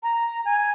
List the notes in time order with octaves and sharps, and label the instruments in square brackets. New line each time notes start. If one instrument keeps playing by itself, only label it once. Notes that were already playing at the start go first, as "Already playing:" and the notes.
[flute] A#5
G#5